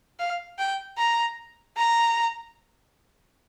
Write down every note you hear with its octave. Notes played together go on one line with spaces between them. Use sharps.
F5
G5
A#5
A#5